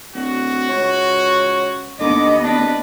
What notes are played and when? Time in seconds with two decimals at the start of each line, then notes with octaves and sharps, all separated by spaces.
0.15 D1 F#4
0.69 C#2 C#5
2.00 D#2 D3 B3 D#5 D6
2.44 D1 D4 B4